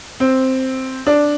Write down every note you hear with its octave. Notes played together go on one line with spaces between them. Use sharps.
C4
D4